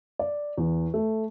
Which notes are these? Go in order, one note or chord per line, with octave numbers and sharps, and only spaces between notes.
D5
E2
A3